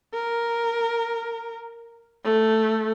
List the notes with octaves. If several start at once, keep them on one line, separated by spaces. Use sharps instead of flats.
A#4
A3